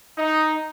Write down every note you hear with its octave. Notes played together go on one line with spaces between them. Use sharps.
D#4